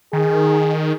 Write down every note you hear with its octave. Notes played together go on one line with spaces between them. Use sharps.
D#3 G#4